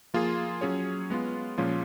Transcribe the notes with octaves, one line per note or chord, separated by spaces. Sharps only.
F3 A#3 F4 G#4
F#3 C#4 G#4 C#5
G#3 B3 F4
A#2 F3 G#3 C#4 F4